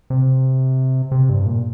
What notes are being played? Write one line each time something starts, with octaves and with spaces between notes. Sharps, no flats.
C3
C3
G2
A#2